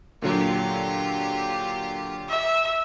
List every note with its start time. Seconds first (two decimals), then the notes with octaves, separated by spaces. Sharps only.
0.22 A#2 D3 F#3 F4 G4
2.29 E5